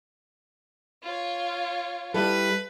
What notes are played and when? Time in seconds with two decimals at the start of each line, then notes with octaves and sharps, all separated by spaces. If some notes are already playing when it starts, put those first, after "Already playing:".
1.03 F4 C#5
2.14 G3 E4 A4 B4